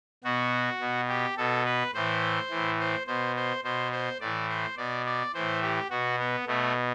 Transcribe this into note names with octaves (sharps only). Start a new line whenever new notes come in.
B2 F#4
B2
G4
B2 A4
B4
A2 E3 C5
A2 E3
C5
B2 C5
C5
B2 C5
C5
A2 E3 D5
C5
B2 D5
D5
A2 E3 C5
G4
B2 F#4
B3
B2 A3